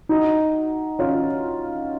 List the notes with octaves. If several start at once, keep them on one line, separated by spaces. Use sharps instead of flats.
D#4 F#4
C#4 F4